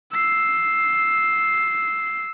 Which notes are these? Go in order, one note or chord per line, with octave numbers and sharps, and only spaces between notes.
E6 C7